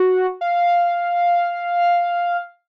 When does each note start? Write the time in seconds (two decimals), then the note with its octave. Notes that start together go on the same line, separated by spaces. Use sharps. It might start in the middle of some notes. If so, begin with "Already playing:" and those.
Already playing: F#4
0.41 F5